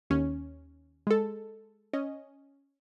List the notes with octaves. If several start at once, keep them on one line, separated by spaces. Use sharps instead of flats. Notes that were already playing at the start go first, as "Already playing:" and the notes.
D#2 C#4
G#3 A4
C#4 D#5